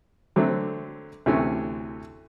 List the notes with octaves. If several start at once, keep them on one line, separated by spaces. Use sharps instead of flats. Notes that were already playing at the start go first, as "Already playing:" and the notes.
D3 F#3 A3 C4
D2 C3 E3 A3 C#4